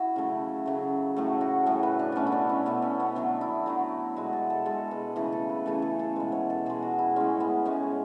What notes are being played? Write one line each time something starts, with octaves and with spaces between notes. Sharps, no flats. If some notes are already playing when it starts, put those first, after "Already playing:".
Already playing: E4 F#4
C#3 F#3 A3
C#3 F#3 A3
A2 F#3 A3
F#4
A2 F#3 A3 G#4
B4
D4
B2 A3 C#4 D4
E4
D4
C#4
B2 A3 B3
C#4
B3
D3 F#3 A3
E4
D3 F#3 A3
B2 G#3 F#4
A4
A4
B2 G#3 A4
B4
C#3 E3 A3 B4
A4
B4
C#3 E3 A3 A4
G#4
A4
B2 G#3 B4
C#5
A4
B2 G#3 G#4
F#4
E4
A2 G#3 C#4
B3
A2 G#3 C#4